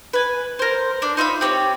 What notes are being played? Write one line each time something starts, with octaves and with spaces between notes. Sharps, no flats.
B4 G#5
A#4 C5
D4
D#4 F4 E5 B5
C4 G4 A#4 C#5